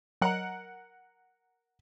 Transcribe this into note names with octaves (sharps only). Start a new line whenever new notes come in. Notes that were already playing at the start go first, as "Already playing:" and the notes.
F#3 A#4 D#5 F#5 A#5